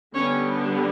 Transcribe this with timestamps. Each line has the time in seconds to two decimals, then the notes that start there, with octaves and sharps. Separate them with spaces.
0.15 D3 G3 B3 C#4 C#5